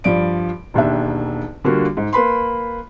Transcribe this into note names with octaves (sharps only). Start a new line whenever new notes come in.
G2 F3 D5 D7
E1 D#2 D4 E5
D3 G3 A#3 D4 F4 F#4
G#2
A#3 B4 B5 C6